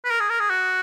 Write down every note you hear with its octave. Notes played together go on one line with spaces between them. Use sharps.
B4
A#4
G#4
A#4
G#4
F#4